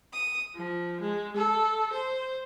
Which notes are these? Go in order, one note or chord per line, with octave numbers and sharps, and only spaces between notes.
D#6
F3
G#3
A4
C5